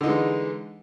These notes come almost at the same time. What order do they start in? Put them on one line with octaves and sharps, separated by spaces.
D3 D#4 E3 G#3